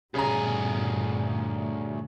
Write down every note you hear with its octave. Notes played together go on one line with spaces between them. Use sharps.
D2 G2 A#2 C#3 G#4 A#5